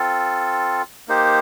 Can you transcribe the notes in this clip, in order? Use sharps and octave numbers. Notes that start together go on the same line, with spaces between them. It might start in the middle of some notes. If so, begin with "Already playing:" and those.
Already playing: C4 F4 A4
A#3 D#4 G4 C5